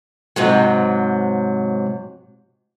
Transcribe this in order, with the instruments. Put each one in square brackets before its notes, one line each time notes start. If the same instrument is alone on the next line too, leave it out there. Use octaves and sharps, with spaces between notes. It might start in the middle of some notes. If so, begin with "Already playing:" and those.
[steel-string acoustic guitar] G#2 C3 F#3